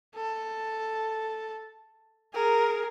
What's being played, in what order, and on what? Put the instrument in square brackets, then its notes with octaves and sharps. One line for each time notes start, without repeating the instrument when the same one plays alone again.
[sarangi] A4
[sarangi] G#4 [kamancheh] A#4